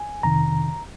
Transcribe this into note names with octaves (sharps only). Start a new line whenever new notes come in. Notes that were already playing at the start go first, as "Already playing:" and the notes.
Already playing: G#5
F2 C3 D#3 A#5